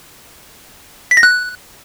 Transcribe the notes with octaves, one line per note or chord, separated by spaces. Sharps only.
B6
A#6
F#6